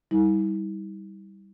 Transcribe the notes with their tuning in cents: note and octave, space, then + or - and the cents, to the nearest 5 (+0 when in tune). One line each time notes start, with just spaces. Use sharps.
G3 +0 E4 -45